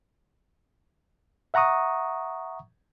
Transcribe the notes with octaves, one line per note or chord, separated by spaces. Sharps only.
E5 F#5 A#5 C#6 D#6